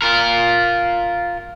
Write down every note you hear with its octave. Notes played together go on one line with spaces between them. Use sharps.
F4 A#4